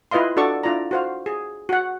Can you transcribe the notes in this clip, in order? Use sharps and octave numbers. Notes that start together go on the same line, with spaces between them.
E4 F4 B4 D#5 F5 C6
D4 F#4 A4 D5 C#6
D4 E4 F4 D5 A#5
F#4 C5 F5
G#4
F#4 F#5